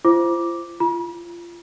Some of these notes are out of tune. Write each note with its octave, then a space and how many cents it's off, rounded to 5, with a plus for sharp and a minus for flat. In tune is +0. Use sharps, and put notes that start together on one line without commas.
F4 -40 C5 +0 D6 +0
F4 -25 B5 -45